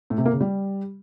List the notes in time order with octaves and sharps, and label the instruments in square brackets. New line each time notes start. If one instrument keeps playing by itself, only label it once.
[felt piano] A2
C3
A#3
C#3
G3